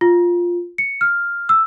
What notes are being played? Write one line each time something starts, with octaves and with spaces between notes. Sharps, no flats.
F4
C#7
F6
E6